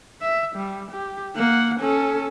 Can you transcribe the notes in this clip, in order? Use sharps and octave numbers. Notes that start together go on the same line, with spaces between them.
E5
G3
G4
A#3 F#5
C#4 A4